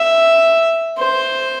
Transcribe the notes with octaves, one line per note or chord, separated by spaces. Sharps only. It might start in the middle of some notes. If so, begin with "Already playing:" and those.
Already playing: E5
C5